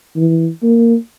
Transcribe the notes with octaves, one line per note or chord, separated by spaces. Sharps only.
E3
A#3